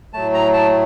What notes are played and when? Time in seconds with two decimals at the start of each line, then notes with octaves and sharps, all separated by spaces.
0.13 A2 F#3 A3 A5
0.34 A#5
0.53 A5